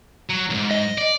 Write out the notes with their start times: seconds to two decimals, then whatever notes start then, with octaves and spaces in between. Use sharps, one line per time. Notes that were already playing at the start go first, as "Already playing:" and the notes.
0.29 F#3
0.50 C2 G#2
0.71 D#5
0.98 D5